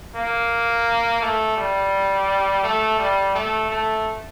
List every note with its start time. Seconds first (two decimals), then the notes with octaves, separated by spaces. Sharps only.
0.16 A#3
1.22 A3
1.57 G3
2.63 A3
2.99 G3
3.35 A3
3.70 A3